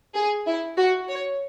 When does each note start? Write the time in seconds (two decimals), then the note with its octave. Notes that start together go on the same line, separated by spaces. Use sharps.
0.14 G#4
0.46 E4
0.76 F#4
1.07 C#5